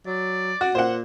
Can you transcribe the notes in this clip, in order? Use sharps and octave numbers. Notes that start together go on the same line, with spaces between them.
F#3 D5
F#4
A#2 C5 F#5